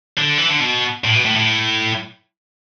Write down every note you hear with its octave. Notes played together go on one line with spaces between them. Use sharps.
D3
E3
D3
B2
A2
B2
A2
A2